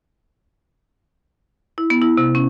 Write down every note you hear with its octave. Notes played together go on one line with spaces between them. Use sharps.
E4
B3
E4
C3
C#4